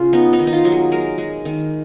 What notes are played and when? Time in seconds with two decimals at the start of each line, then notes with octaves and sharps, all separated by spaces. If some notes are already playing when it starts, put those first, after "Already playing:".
Already playing: C#3 F4 G#4
0.13 B3 D#4
0.33 D#4
0.39 D#3
0.47 D#4
0.53 F4
0.65 F#3
0.72 G#4
0.92 G#3 A#4
1.18 G#3
1.45 D#3